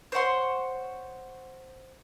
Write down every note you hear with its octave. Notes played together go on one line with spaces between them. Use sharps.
C5 C#5 F#5 C6